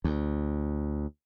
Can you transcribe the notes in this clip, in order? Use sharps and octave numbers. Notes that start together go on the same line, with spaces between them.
D2